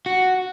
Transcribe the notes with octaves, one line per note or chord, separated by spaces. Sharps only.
F#4